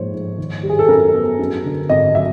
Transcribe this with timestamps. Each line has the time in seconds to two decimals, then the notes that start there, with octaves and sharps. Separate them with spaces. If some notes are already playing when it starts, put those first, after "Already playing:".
Already playing: G#2 F3 A#3 C5 C#5
0.13 G#2
0.38 D#3
0.63 G3
0.70 G#4
0.79 A4
0.88 F#2 A#4
1.14 B3
1.39 F#2
1.64 D3
1.89 G#1 D#5
2.15 F#3 E5